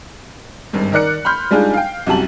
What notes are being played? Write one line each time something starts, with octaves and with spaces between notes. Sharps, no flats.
G#1 G2
D#3 A#4 D5 F#6 C#7
B5 C6 F6 G6
G3 G#3 D4 D#4 F4 G#4
F5 G5
C2 F#2 F#4 G4 A5 F#7